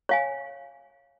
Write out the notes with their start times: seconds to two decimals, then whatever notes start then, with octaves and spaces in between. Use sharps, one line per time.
0.09 C#5 F5 G#5